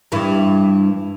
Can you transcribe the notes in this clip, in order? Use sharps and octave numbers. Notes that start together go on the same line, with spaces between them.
G2 E3